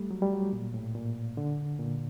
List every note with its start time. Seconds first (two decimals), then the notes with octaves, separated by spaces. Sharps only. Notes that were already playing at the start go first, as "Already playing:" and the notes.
Already playing: G3 A3
0.11 F#3
0.22 G3
0.33 F#3
0.53 A#2
0.74 A2
0.95 A#2
1.37 D3
1.79 A#2